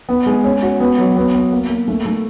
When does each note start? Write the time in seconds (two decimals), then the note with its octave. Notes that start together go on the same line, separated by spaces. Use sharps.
0.09 B3
0.26 G#3
0.44 C#4
0.62 F#4
0.80 B3
0.99 F#3
1.17 B3
1.34 B3
1.52 A#3
1.70 A#3
1.88 A3
2.06 A3